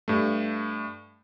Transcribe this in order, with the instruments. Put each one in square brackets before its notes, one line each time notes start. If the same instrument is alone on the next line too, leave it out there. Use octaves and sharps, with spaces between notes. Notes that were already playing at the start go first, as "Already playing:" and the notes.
[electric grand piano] G2 A3